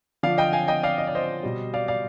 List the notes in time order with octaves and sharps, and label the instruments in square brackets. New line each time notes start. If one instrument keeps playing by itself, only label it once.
[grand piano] D3 F3 D5 F5
D#5 G5
F5 G#5
D#5 G5
D5 F5
D#5
D5
C5 D#5
B2 G3
D5 F5
D5 F5